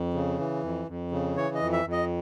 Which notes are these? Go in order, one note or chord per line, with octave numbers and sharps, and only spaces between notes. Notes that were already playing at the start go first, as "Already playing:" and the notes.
Already playing: F2
C#3
E3
F2
F2
C#3
E3 C#5
D#5
F2
E5
F2
D#5